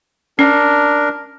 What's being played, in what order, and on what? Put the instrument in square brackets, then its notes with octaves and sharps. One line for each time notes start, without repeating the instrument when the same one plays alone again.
[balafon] C#4 [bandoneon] D4 A#4